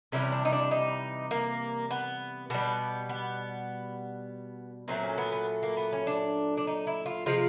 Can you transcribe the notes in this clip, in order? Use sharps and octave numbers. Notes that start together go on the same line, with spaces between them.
C3 E3 G3 C#4
D4
D#4
D4
D#4
A#3
B3
B2 G3 B3
B3
A#2 F#3 A3 C4
C#4
B3
B3
A#3
B3
C#4
D4
D4
D#4
E4
F4
C3 F3 G#3 F4